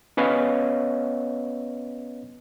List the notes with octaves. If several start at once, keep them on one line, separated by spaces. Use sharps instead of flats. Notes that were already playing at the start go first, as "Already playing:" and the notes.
B3 C#4 B4 C#5 D#5 F5